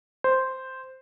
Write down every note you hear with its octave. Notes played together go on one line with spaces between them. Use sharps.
C5